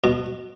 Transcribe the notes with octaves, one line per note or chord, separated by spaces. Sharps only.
B2